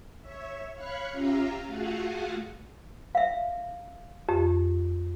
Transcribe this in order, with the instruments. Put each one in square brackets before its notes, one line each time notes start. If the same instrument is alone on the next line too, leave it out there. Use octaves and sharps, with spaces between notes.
[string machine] C#5 E5
C#5 F5 B5 C#6 F#6 C#7
C#4 F4 G4 E5 F5 A#5
A3 F4 F#4 G#4 F5 F#5
[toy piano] E5 F5
[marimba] F2 [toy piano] G4